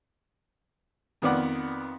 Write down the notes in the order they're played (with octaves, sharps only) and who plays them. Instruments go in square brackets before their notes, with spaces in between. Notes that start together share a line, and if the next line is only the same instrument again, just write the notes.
[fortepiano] F2 D#3 B3 D5 F#5